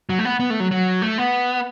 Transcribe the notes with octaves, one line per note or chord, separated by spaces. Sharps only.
F#3
A3
B3
B3
A3
F#3
F#3
A3
B3